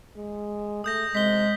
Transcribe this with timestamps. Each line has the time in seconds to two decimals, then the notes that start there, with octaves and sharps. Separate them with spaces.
0.16 G#3
0.84 A3 D#6 G6 A#6
1.15 C3 G#3 B6 G7